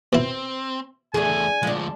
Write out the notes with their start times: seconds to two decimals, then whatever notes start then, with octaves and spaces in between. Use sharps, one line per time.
0.13 B2 C4 E4
1.14 E2 A3 D4 G#4 G#5
1.63 D2 F3 G#3 D4